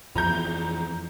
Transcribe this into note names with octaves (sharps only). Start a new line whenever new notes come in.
F2 E3 F3 A#5 G6